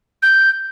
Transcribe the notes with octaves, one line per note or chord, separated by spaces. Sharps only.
G6